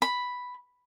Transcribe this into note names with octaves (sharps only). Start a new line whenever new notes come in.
B5